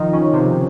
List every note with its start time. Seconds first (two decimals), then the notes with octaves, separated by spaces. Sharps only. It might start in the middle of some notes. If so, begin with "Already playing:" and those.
Already playing: D#3 F3 D#4 F4
0.12 C#3 C#4
0.33 C3 C4